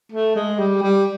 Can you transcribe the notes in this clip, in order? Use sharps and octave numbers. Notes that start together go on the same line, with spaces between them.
A3
G#3
G3
G3